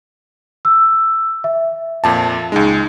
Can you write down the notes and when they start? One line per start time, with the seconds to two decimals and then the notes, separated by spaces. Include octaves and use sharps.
0.65 E6
1.44 E5
2.04 F2 A#2 A5
2.52 C#2 G#3 D#4